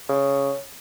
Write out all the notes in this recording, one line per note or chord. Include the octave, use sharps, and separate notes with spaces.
C#3